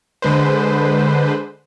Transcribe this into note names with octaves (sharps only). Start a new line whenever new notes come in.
D3 G#3 B4 C5